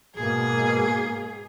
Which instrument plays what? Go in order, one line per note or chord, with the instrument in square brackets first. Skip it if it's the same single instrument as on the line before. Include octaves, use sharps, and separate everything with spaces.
[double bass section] G#2 B2 A#3 [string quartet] G#4